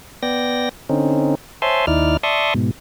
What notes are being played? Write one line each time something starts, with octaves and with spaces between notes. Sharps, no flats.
B3 D5 G5 A#6
D3 C4 C#4 D#4
C5 C#5 E5 G#5 A5 C6
D#2 D#4 E4 D5 F6
D5 E5 A5 C6 C#6 D#6
G#2 B2